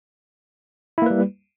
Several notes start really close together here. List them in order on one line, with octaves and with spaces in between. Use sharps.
E4 A#3 B4 G3